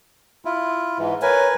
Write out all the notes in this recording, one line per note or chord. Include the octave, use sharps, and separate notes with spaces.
E4 F4
G#2 E3
A#4 B4 C#5 G#5